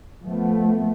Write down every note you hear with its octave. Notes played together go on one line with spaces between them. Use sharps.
F3 A3 B3